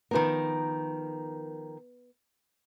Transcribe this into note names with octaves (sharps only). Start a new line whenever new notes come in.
D#3 F3 B3 A#4 B4